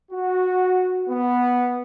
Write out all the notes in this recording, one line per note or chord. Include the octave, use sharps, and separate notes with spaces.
F#4
B3